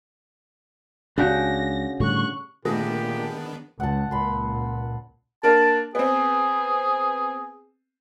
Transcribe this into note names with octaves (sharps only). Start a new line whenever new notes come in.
C#2 C#3 D4 F#4 G4 A#6
A2 D3 G3 C#6 F#6
A#2 D#3 A3 B3 D4 G4 G#4 A#6
C#2 F#5 A5
C#2 A#2 B5 C6
A#3 D4 A#4 A5
B3 C4 G#4